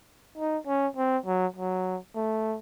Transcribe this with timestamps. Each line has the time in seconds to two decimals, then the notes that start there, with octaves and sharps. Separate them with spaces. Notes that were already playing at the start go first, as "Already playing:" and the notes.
0.37 D#4
0.67 C#4
0.97 C4
1.26 F#3
1.56 F#3
2.15 A3